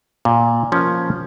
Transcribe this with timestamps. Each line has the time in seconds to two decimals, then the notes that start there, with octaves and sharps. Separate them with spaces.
0.25 A#2
0.72 F3 A#3 C#4